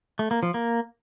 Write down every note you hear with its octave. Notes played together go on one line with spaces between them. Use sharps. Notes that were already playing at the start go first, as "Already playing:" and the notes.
A3
A#3
F3
A#3